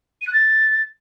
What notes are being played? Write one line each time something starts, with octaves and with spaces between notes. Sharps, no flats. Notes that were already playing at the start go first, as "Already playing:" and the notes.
D#7
F#6
A6